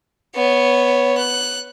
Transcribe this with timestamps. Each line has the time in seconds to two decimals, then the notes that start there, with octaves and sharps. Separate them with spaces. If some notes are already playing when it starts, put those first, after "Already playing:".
0.36 B3 C#5
1.18 F#6